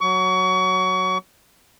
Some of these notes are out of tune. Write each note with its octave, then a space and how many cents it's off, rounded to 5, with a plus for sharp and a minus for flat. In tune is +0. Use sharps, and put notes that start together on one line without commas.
F#3 +0 C#6 +30